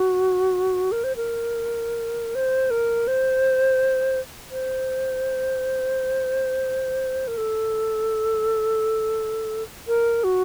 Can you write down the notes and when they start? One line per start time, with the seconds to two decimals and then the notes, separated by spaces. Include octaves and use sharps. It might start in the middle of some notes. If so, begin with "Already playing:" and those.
Already playing: F#4
0.92 A#4
1.04 C5
1.16 A#4
2.35 C5
2.71 A#4
3.08 C5
4.51 C5
7.28 A#4
7.37 A4
9.88 A#4
10.24 F#4